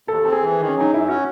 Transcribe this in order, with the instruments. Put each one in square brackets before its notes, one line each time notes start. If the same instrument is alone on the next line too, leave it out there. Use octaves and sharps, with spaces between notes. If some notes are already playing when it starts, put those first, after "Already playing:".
[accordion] D#2 [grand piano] A4
[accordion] C4 [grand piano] A4
[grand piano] G#4
[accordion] E3
D#3
[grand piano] C#4
[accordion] F#3
[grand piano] D#4
[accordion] F#2 [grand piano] E4
[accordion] C#4 [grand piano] F#4